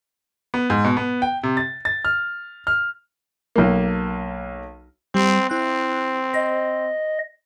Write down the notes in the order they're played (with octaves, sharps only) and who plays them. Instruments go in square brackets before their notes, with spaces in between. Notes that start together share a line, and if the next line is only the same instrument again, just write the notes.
[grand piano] B3
G#2
B2
B3
G5
C3
A6
A6
F6
F6
[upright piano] B1 A#3
[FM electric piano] G3 [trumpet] C4
[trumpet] C4 [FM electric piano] E4 F#6
[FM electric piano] C5 [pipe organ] D#5